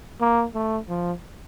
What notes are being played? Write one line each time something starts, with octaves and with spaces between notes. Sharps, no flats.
A#3
A3
F3